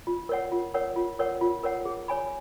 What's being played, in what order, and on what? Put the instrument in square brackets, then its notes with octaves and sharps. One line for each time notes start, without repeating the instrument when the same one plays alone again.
[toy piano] F4
A#4 C#5 F#5
F4
A#4 C#5 F#5
F4
A#4 C#5 F#5
F4
A#4 C#5 F#5
G#4
C#5 G#5 B5